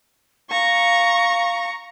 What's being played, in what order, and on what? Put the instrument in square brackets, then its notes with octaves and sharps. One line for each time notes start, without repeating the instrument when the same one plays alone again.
[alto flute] F5 [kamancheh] A#5 C#6